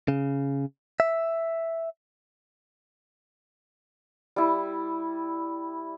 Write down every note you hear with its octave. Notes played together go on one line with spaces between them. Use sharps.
C#3
E5
G3 E4